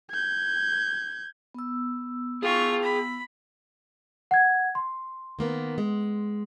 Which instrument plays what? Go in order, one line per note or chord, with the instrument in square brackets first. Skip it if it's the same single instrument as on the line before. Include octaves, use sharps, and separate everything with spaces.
[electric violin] G6 G#6
[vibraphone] B3 E6
[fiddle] F4 C#6 [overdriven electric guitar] G#4 G5
[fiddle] B5
[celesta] F#5 G#6
C6
[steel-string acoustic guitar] D#3 A#3 B3
G#3